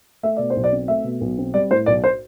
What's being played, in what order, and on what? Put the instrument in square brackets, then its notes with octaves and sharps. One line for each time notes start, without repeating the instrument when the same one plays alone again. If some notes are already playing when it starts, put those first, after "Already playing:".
[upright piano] A3 E5
B2 D5
C5
B1
D5
C4
A3 E5
B2
B1
C4
G3 D5
A2 C5
B1 D5
C5